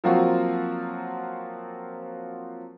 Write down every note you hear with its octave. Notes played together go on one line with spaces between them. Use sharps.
F3 F#3 A#3 C4 F4 F#4